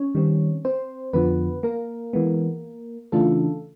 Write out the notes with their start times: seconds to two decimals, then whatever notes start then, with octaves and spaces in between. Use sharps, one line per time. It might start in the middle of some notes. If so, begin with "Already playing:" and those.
Already playing: C#4 C#5
0.15 D#3 G3 C4
0.65 C4 C5
1.13 F2 D3 F3 B3 B4
1.63 A#3 A#4
2.13 E3 G#3 B3
3.12 C#3 E3 A3 D4 F4 A4